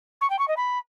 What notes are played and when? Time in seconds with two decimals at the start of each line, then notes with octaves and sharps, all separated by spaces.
0.21 C#6
0.30 G5
0.39 C#6
0.48 D#5
0.57 B5